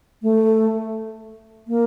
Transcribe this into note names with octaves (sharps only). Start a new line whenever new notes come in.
A3
A#3